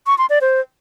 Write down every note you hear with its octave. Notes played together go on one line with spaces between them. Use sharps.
C#6
C6
D5
C5